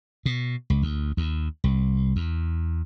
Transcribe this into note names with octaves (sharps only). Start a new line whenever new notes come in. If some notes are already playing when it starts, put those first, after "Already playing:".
B2
C#2
D2
D#2
C2
E2